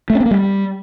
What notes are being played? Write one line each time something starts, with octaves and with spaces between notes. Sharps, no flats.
A3
C#4
C4
A#3
G3